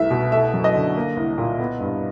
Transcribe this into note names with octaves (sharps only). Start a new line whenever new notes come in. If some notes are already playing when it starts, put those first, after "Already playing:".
Already playing: C2 A3 E5
B2
A3 E5
F#2
D#5
D3
A#3
C2
A#2
B3
G2